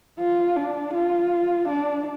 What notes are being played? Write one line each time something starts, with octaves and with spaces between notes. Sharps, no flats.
F4
D4
F4
D4